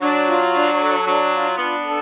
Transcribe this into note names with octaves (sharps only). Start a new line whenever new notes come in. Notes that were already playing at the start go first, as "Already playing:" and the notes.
F#3 D4
F4
D4
A4
F#3 D4
F4
B3 D4
A4